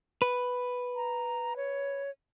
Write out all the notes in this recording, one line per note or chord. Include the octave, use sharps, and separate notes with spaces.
B4
A#5
C#5